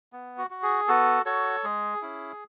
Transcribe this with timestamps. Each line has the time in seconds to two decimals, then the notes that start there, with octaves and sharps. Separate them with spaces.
0.13 B3
0.38 F#4
0.50 F#4
0.63 G#4
0.88 B3 F#4 A4
1.26 F#4 A4 C#5
1.64 G#3 G#4
2.02 C#4 E4